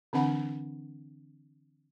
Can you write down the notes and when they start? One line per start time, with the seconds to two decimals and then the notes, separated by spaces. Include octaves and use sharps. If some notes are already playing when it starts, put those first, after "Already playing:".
0.13 D3 E3 C4 D4 F#5 B5